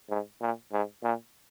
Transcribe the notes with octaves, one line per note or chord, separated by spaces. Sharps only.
G#2
A#2
G#2
A#2